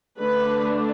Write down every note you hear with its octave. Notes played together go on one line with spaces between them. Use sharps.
D3 A3 D4 B4